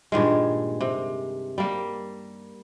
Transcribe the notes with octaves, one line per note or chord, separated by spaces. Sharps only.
G2 A#2 D#3 G#3
C3
G3 A#3